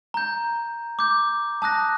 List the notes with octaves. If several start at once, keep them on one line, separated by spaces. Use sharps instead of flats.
A#5 G6
D6 G6
A5 D#6 F#6 A#6